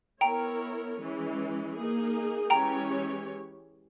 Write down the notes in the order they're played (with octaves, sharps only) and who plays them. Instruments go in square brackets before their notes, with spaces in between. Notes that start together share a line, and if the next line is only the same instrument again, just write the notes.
[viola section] B3 E4 A#4 C#5 [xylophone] G5 A#5
[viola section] E3 G#3 C#4
A#3 D#4 G#4
[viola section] E3 G#3 C#4 G4 C#5 [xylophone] G5 A#5